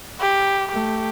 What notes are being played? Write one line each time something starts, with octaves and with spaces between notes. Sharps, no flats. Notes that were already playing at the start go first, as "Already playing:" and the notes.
G4
A3 G4